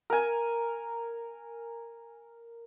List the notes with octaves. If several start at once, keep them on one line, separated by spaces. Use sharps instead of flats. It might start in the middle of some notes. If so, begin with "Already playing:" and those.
A#4 G#5